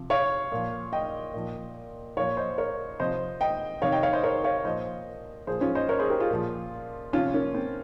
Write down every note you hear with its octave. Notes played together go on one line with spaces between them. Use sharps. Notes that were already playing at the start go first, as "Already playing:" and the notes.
Already playing: C3 F3
C#5 F5
A#2 F3
D#5 G5
A#2 F3
A#2 F3 C#5 F5
C5 D#5
A#4 C#5
C3 F3 C5 D#5
D#5 G5
C3 D#3 C#5 F5
D#5 G5
C#5 F5
C5 D#5
A#4 C#5
C#5 F5
A#2 F3 C5 D#5
A#2 F3 G#4 C5
C#4 F4
C5 D#5
A#4 C#5
G#4 C5
G4 A#4
F4 G#4
A#2 F3
C3 F3 C#4 F4
A#3 C#4
C4